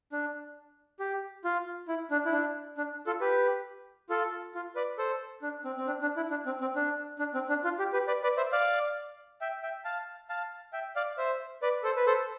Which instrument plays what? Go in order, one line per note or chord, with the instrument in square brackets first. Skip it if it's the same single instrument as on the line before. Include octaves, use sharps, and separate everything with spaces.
[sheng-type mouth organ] D4
G4
F4
E4
D4
E4
D4
D4
F4 A4
G4 B4
F4 A4
F4
B4 D5
A4 C5
D4
C4
C4
D4
D4
E4
D4
C4
C4
D4
D4
C4
D4
F4
G4
G4 B4
B4 D5
B4 D5
C5 E5
D5 F5
E5 G5
E5 G5
F5 A5
F5 A5
E5 G5
D5 F5
C5 E5
B4 D5
A4 C5
B4
A4 C5